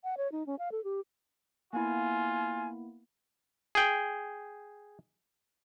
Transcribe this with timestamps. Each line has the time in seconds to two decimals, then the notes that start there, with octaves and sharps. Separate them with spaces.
0.04 F#5
0.18 C#5
0.32 D#4
0.47 C#4
0.59 F5
0.72 A4
0.84 G4
1.73 A#3 B3 E4 F4 G#5
3.75 G#4 G5